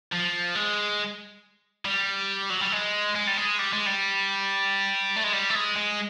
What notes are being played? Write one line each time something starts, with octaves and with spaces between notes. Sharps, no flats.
F3
G#3
G3
F#3
G3
G#3
G#3
G3
G#3
G3
G#3
G3
A3
G#3
G3
A3
G#3
G#3